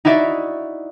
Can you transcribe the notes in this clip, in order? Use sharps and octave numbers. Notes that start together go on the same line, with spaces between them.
D#4 E4 F#4 D5 E5